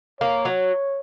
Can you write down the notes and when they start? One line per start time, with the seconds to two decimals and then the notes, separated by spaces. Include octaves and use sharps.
0.20 A#3 C#5
0.45 F#3